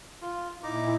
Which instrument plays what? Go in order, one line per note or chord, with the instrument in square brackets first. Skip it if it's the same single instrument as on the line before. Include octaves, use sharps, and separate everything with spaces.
[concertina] F4
[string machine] A#2 E4 [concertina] D#4 A#5 D6